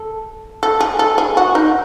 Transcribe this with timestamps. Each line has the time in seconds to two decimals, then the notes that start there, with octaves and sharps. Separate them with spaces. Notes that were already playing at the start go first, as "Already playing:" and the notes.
Already playing: A4
0.63 A4
0.80 G#4
0.99 A4
1.18 G#4
1.37 F#4
1.55 D#4